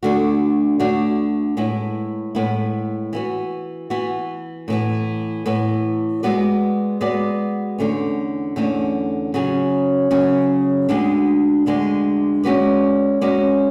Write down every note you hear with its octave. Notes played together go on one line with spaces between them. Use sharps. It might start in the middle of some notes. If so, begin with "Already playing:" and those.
D2 D3 A3 D4 F#4
D2 D3 A3 D4 F#4
A2 G#3 B3 E4
A2 G#3 B3 E4
E3 B3 F#4
E3 B3 F#4
A2 E3 B3
A2 E3 B3
G#3 B3 F#4 B4 D5
G#3 B3 F#4 B4 D5
E2 D3 A3 C#4
E2 D3 A3 C#4
C#3 F#3 C#4 G#4
C#3 F#3 C#4 G#4
D2 D3 G#3 B3 D4
D2 D3 G#3 B3 D4
G#3 C#4 F#4 B4 D5
G#3 C#4 F#4 B4 D5